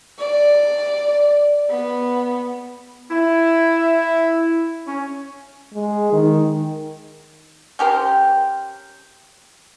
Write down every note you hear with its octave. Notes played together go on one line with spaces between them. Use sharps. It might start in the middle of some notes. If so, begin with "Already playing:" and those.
D5
B3
E4
C#4
G#3
D#3
C#4 G4 A#4 C5